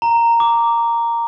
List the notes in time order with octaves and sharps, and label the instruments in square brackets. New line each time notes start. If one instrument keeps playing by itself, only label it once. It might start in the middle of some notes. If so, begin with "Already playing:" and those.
[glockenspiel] A#5
D6